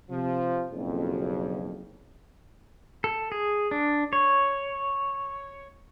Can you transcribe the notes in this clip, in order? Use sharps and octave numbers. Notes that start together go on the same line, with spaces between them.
C3 F3
F#1 B1 F2
A4
G#4
D4
C#5